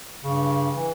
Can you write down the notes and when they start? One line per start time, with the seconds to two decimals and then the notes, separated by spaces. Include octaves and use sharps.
0.24 G2 C#3
0.74 E3